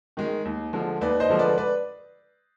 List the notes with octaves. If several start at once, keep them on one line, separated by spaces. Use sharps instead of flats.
D#3 G#3
D#2
D3 F3 G#3
D#2 B4 D5
C5 D#5
D3 F3 G#3
B4 D5
B4 D5